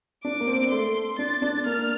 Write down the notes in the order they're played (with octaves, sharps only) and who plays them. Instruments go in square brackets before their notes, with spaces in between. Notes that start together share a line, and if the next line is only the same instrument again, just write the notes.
[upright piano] D4 [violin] D6
[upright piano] A#3
C4
[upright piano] A3 [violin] C6
[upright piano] D4 [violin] A6
[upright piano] D4
[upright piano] A#3 [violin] F6